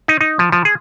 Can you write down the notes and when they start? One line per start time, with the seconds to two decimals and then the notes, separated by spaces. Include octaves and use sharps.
0.08 D#4
0.21 D#4
0.39 F3
0.52 F3
0.65 G#4